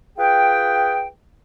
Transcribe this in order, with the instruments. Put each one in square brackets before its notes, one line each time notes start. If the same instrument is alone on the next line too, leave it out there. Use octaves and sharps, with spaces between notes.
[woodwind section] F4 G#4 B4 G5